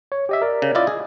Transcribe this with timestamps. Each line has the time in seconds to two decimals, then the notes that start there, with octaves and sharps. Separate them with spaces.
0.12 C#5
0.29 G4 D#5 E5
0.42 A#4 D5
0.62 C#3
0.75 E4 F4 D5 D#5
0.87 G#4